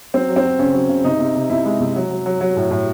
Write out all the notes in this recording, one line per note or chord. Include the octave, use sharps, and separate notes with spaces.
F#3 C4
F#3
C4
F#3
C#3 C#4
F#3
C#3
C3 D#4
C3
C3
C3 E4
G#3
C3
F#3
F#3
F#3
F#3
A2
A2